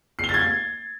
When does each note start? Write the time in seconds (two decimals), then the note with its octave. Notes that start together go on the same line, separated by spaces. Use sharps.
0.19 C7
0.24 G7
0.29 A6
0.34 G#6
0.39 A6